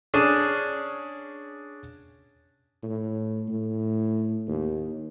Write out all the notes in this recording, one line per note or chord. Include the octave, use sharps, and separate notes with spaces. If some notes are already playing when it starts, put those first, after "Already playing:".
C#4 D4 G#4
A2
A2
D#2